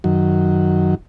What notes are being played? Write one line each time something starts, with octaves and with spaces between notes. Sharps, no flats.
F#2 D#3 F#3